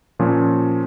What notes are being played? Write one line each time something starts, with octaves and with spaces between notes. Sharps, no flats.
A#2 F3 C#4